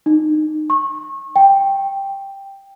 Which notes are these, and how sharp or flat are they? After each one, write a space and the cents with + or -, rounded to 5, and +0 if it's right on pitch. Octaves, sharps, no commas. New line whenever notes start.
D#4 -20
C#6 -30
G5 +5